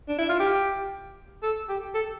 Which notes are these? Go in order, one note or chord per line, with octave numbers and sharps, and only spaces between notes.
D4
E4
F4
G4
A4
G4
A4